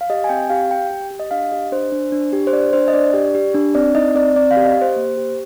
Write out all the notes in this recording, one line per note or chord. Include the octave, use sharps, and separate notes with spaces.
F5
G4 D#5
G#5
C4 G5
G4 F5
G4 G5
G4
G4
D#5
D4 F5
G4 D#5
D4 C5
D4
D4
G4
C5
D4 D5
D4 C5
D#5
D4 D5
G4
G4
D4
C4 D5
D#4 D#5
C4 D5
C4 D5
F5
G4
D#5
G4
C5
A#3
G4